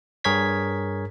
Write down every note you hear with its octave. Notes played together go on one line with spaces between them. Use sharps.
G2 G#4 A#4 C#5 G#6 B6